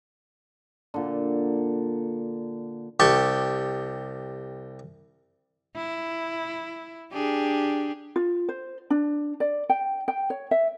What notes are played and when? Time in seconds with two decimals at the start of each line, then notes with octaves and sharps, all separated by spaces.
0.94 A#2 D3
3.00 C2 G4 A5 C6 C#6
5.75 E4
7.12 D4 G4 G#4
8.16 F4
8.49 C5
8.90 D4
9.40 D5
9.69 G5
10.08 G5
10.30 C#5
10.51 E5